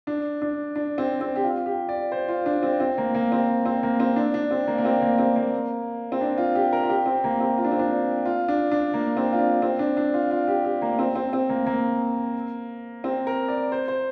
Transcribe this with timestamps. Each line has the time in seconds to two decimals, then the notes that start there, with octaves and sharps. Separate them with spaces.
0.07 D4
0.42 D4
0.76 D4
0.98 C4
1.21 C4
1.36 G4
1.44 F4
1.66 G4
1.89 D5
2.12 C5
2.28 F4
2.46 D4
2.63 C4
2.80 C4
2.98 A#3
3.15 A#3
3.32 C4
3.66 C4
3.83 A#3
4.00 C4
4.16 D4
4.34 D4
4.51 C4
4.67 A#3
4.78 A#3
4.85 C4
5.02 A#3
5.19 C4
5.36 A#3
6.12 C4
6.21 D4
6.38 F4
6.55 G4
6.73 A#4
6.83 F4
6.90 G4
7.06 C4
7.24 A#3
7.40 C4
7.58 F4
7.64 D4
7.72 C4
7.79 D4
8.25 F4
8.48 D4
8.71 D4
8.94 A#3
9.17 C4
9.33 F4
9.39 D4
9.62 C4
9.79 D4
9.97 D4
10.14 F4
10.31 F4
10.48 G4
10.65 G4
10.82 A#3
10.99 C4
11.15 C4
11.33 C4
11.49 A#3
11.66 A#3
13.04 C4
13.27 A#4
13.48 D5
13.72 C5
13.88 C5